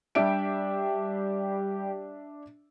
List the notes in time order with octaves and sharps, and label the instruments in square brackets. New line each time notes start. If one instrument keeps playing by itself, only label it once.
[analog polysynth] G3 G4 [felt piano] D4 E5 D7